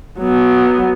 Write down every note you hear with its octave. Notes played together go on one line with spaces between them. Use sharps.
F#3 B3